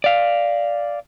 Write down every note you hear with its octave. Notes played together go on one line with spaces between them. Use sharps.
D5 F5